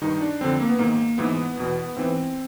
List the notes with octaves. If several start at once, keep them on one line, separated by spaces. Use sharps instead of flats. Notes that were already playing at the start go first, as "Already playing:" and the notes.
G2 D#3 D#4
D4
F2 D3 C4
A#3
B3
G#2 D#3 A#3
G#2 E3 B3
E2 B2
G#2 E3 C4